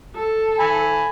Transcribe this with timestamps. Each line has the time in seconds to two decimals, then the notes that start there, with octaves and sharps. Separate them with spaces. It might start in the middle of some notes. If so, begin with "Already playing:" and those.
0.15 A4
0.59 G#5 B5